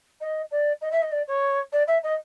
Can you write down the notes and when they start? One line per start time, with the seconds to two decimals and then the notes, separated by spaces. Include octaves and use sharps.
0.21 D#5
0.51 D5
0.81 D#5
0.92 E5
1.02 D#5
1.12 D5
1.28 C#5
1.72 D5
1.87 E5
2.03 D#5